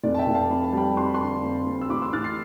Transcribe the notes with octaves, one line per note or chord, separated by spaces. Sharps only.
F1 D5
A5
E5 G5
F1
F5 A5
F2 B5
A5
G3 G5 B5
F2 C6
B5
A5 C6
D3
F2
F2
E6
A1 B5 D6
C6 E6
A1 F6 A6
A6 C7